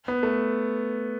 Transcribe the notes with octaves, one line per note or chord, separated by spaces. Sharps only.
B3
A3